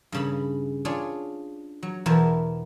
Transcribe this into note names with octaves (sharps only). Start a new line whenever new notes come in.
G2 C#3 B5
D4 F4 G#4 C#5 D5
F#3
E2 B2 B3 E4 A#4 A5